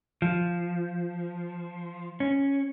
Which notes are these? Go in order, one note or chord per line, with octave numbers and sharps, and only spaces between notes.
F3
C#4